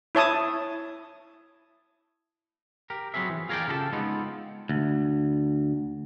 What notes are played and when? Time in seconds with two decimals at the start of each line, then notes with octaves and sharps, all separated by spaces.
0.15 E4 C#5 A5 D#6
2.90 G4 A#4
3.14 F#3 B3 C4 G#4 E5
3.29 E3
3.49 F4 G#4 A#4 C5 D5 G5
3.67 C#3 G4 A4 B4 A5
3.93 G#3 B3 C4 D#4 F4
4.69 D2